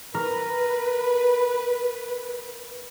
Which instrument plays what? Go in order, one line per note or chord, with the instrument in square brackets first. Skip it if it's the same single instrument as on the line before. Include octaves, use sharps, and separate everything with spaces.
[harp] A#4 [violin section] B4